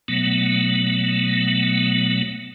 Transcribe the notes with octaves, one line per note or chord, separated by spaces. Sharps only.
B2 F#3 A3 B3